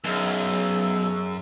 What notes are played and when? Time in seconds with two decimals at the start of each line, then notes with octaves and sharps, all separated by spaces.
0.04 B1 F#2 G#4 E6